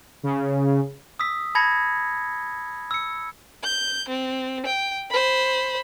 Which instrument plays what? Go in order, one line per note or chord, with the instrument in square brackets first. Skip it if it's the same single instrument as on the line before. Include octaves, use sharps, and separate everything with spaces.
[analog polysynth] C#3
[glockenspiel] D#6 E6 B6
A5 B5 G#6 A#6 C#7
E6 C#7
[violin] G6
C4
G5
C5 B5